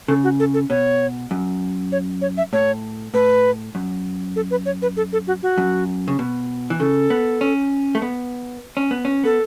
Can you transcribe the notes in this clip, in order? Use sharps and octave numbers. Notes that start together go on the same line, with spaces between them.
C#3 A4
F#4
A4
A4
B2 C#5
F#2
C#5
C#5
E5
A2 C#5
A2 B4
F#2
A4
B4
C#5
B4
A4
A4
F#4
F#4
F#2
C#3
B2
E3
C#3 A4
B3
C#4
A3
B3
C#4
B3
C#4
B3 A4